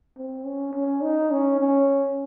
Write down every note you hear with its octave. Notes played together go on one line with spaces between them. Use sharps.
C4
C#4
C#4
D#4
C#4
C#4